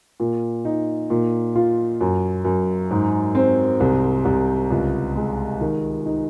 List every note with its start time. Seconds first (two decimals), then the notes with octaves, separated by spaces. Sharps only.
0.20 A#2
0.65 D#4
1.10 A#2
1.56 F4
2.01 F#2
2.45 F#2
2.91 G#2
3.35 C4
3.80 C2
4.25 C2
4.70 C#2
5.15 G#3
5.61 D#3
6.06 D#4